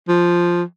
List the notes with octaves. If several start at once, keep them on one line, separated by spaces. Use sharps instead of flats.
F3